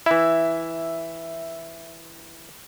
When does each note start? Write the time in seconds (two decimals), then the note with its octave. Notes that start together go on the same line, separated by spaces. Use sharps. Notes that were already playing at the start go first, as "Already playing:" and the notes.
0.06 E3 E4 E5